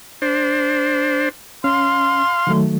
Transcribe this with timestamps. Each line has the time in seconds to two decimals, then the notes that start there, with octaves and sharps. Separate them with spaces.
0.22 D4 C5
1.64 C#4 F5 C6
2.47 D#3 F#3 A3